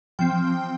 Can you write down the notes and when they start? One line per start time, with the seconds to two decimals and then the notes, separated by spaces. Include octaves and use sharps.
0.19 F3 C4 G5